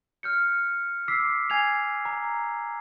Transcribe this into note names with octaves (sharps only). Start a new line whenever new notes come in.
F6 G6 C#7
D6 E6 B6 C7
G#5 G#6 C7 F7
A#5